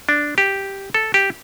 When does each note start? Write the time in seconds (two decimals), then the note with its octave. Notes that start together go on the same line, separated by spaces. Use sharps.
0.09 D4
0.38 G4
0.94 A4
1.14 G4